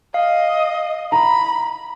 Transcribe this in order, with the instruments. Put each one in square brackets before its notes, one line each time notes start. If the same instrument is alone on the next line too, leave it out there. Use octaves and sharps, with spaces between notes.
[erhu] D#5 [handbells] F5
[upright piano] A#5 [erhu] B5